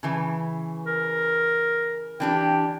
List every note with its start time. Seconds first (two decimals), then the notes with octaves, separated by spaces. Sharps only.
0.03 C#3 E3 B4
0.86 A#4
2.20 E3 D4 G4 G5